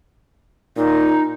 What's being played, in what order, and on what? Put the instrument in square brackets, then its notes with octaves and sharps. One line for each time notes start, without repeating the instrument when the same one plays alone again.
[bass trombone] A#2 [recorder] D#4